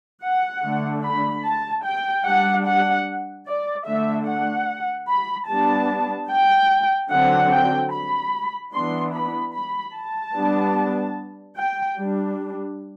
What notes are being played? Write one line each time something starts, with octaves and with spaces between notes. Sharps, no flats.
F#5
D3 A3 D4
B5
A5
G5
G3 D4 F#5
F#5
D5
D3 A3 D4 E5
F#5
B5
G3 B3 D4 A5
G5
D3 F#3 C4 F#5
G5
B5
E3 B3 D4 C6
B5
B5
A5
G3 B3 D4
G5
G3 D4